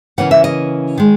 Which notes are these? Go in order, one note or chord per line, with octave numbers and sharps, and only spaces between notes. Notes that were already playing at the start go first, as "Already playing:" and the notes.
C#3 E3 A#3 C#4 F#5
E5
D#5
D#3 G#3